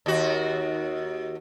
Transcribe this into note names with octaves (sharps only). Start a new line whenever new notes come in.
D#2 F#4